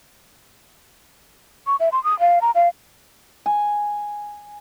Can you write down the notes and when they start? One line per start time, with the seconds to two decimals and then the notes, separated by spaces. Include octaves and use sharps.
1.67 C#6
1.80 E5
1.92 C6
2.04 D#6
2.19 F5
2.41 A#5
2.55 F5
3.46 G#5